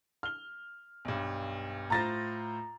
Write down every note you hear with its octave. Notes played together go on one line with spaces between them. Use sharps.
F6 G7
B1 G2
A2 F4 C5 A#5 A6 A#6